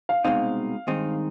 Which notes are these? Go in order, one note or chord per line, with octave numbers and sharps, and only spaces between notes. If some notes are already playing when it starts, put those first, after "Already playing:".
F5
C2 B2 G#3 C4 D#4 F5
G2 D#3 G#3 C4 D#4